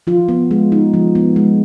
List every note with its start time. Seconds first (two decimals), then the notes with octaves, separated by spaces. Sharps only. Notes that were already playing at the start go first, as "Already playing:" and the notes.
0.07 F3 F4
0.29 B3
0.51 G#3
0.72 D#4
0.94 F3
1.15 B3
1.36 G#3